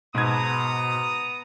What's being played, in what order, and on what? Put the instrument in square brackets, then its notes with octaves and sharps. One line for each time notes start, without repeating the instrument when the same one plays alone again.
[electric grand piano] G#2 G#6 [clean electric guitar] B2 [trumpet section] B3 A#5 D#6